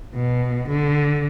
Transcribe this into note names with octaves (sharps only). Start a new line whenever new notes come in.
B2
D3